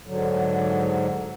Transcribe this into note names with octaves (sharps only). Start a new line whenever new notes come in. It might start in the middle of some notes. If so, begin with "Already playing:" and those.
G#2 D3 F#3